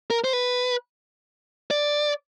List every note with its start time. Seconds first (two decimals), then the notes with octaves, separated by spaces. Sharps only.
0.10 A#4
0.24 C5
0.33 B4
1.71 D5